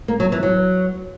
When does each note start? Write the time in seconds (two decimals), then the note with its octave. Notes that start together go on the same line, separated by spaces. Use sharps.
0.08 A#3
0.20 F#3
0.32 E3
0.43 F#3